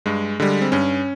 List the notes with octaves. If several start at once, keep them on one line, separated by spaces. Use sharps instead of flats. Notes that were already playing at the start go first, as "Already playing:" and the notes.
G2 G#3
D3 G3 G#3
C4
G2 C#4